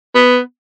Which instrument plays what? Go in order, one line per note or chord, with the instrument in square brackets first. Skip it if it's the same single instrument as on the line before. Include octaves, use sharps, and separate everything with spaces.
[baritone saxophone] B3